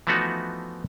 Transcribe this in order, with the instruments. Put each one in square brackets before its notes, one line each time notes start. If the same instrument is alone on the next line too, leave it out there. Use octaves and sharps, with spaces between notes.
[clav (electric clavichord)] E3 F3 A3 B3 D#4 F#4